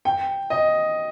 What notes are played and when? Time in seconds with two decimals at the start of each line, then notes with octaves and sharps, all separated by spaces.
0.05 G5
0.50 D#5